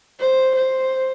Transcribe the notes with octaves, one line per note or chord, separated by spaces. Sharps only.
C5
C5